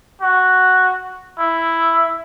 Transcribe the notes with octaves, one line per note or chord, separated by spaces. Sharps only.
F#4
E4